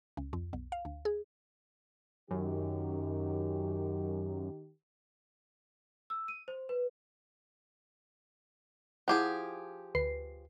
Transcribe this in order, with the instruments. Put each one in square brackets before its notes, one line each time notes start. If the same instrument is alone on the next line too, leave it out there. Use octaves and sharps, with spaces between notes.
[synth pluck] C#2
F2
B1
F5
D2
G#4
[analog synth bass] F#2 [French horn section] D#3 G4
[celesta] E6
D#7
C5
B4
[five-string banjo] F3 G4 G#4 [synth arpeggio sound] E4 F#5
[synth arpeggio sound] D2 B4 C7